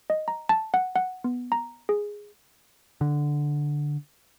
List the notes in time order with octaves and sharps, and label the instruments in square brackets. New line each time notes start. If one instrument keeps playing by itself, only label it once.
[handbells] D#5
A#5
A5
F#5
F#5
B3
A#5
G#4
[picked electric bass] D3